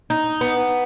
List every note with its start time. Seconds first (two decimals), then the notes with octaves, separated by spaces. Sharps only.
0.10 D#4
0.41 B3